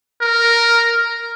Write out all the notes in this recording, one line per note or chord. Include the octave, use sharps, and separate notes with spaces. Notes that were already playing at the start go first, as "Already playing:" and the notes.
A#4